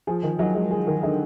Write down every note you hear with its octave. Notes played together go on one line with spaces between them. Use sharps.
F3 G#4
D#3
F#3 D#4
G#3
G#4
D#3
D3 D#4